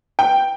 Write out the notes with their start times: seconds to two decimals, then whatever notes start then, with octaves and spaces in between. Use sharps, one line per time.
0.19 G5